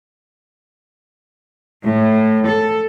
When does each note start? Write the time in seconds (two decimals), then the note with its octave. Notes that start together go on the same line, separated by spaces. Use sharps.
1.84 A2
2.47 A4